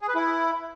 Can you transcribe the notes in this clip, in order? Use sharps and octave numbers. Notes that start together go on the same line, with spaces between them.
G#4
B4
E4